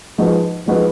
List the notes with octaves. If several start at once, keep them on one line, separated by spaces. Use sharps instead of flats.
F3 G#3 D#4 F#4 B4
F3 G#3 D#4 F#4 B4